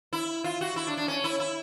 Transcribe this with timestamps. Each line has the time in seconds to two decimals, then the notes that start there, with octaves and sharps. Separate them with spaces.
0.13 E4
0.44 F4
0.61 F#4
0.76 E4
0.87 D4
0.97 D4
1.08 C#4
1.24 E4
1.40 E4